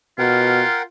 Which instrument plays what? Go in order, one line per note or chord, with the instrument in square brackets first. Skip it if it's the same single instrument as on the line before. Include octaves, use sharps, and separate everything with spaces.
[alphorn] B2 [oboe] F4 [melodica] A#4 F#5 G5